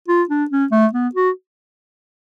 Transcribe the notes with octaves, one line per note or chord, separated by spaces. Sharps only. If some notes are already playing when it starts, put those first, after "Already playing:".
F4
D4
C#4
A3
B3
F#4